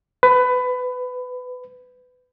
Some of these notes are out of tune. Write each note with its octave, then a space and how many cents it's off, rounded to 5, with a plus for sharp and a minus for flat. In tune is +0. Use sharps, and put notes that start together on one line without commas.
B4 +20